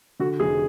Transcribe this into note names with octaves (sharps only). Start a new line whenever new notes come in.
D3 F#4
F1 G#4